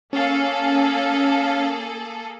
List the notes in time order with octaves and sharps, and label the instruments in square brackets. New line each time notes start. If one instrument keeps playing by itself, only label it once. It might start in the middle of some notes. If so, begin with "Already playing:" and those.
[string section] A#3 G#4 A4 [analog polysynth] C#4 F5